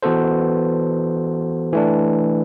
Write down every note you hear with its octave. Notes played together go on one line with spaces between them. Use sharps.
E3 B3 F#4 A4 C5
E3 A3 D4